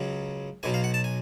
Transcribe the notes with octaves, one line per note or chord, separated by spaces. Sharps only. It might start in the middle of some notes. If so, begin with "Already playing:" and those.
Already playing: C#2 C#3 F#3
B1 B2 F#3 G#5
F5
F#5
A5
G#5